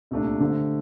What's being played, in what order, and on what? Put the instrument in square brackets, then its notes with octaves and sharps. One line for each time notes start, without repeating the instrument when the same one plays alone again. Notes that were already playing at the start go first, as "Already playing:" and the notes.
[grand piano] C2 A#2 A3 D4
D3 A3 C4